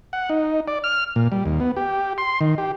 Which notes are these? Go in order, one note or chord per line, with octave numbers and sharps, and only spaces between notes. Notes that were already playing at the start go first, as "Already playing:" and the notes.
F#5
D#4
D5
F6
A#2
G3
D#2
B3
G4
C6
D#3
G4